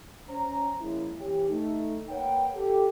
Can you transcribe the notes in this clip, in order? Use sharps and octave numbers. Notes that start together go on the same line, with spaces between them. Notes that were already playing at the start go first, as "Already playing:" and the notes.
C#4 C5 A#5
F3 G#3 A#3 C#4 E4
E3 C#4 G4
A3 D#4
A#3 A#4 B4 C#5 F#5 G5
G4 A4